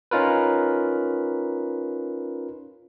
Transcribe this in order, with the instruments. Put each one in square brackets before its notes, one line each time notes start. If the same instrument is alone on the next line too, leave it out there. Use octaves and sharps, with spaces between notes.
[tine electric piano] C#4 D#4 F4 A#4 B4